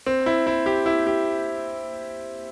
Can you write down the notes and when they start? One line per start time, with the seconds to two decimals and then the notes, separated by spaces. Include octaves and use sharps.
0.06 C4
0.26 E4
0.47 E4
0.66 G4
0.86 E4
1.07 G4